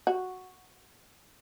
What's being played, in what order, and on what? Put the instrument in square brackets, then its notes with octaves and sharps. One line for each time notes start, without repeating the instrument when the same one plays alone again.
[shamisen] F#4